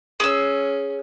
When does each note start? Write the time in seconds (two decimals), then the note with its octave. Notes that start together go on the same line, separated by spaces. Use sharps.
0.20 C#4 G#4 E6